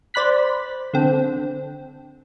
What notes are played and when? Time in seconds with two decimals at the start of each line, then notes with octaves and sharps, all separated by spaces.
0.14 C5 D5 B5 F#6 B6
0.94 D3 C4